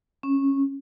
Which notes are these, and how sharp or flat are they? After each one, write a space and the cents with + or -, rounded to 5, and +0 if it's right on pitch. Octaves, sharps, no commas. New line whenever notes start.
C#4 -15